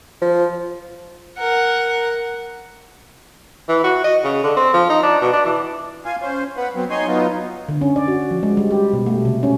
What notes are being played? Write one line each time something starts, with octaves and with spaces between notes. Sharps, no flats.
F3
A#4 F#5
E3
F#4
D#5
C#3
D3
C4
F3
D#4
D4
B2
D4
E3
F4 F5 G#5
C#4 C5
B3 B4 F#5
F#3 B3 C4
D#4 C#5 G#5 C6
F#3 B3 D#4 F4
D3
C#4
D5
F#4
F3
G#3
G3
G4
B2
A3
C3
C#4